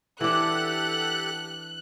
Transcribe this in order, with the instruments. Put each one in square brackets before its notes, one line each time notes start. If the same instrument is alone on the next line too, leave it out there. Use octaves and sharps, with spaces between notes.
[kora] E3 D4 [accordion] G4 A4 F#5 [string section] F#6